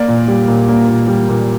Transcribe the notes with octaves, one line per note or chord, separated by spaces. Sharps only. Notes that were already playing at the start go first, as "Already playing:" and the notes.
Already playing: A#3 D5
A#2
G3
A#2
A#3
A#2
G3
A#2